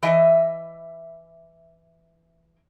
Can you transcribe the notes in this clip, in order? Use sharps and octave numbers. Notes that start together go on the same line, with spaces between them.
E3 D#5 E5 G#5